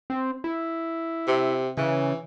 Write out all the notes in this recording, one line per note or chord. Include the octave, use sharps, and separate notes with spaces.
C4
E4
C3
C#3 E3